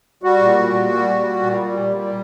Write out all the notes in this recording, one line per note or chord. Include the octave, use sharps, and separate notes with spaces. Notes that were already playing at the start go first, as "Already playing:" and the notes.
G3 F#4
A#2
G3
A#2
G3
A#2
G3
A#2
G3
A#2
G3